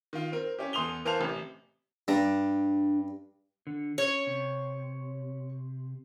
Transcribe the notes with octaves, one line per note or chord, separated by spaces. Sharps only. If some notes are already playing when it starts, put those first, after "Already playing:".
D#3 F4
C4 A#4
C#4 E4 G4
E2 A4 C6 D#6 F7 G7
E3 A#4 C5 F5 A5 F7
A1 C3
G2 D4 A#5
D3
C#4 C#5
C3